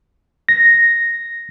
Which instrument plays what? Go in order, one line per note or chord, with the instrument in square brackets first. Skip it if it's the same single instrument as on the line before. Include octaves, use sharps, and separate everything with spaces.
[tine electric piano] A#6